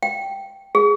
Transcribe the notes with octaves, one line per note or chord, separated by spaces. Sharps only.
G5
G#4